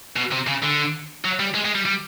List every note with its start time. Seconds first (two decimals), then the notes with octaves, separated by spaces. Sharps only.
0.16 B2
0.32 C3
0.47 C#3
0.62 D3
1.25 F#3
1.40 G3
1.55 G#3
1.65 G#3
1.75 G3
1.86 G3